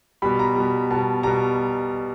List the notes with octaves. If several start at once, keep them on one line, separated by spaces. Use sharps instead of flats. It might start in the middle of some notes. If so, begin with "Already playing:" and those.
B2 G3 B5
A#5
B2 G3
B2 G3 A5
B2 G3 A#5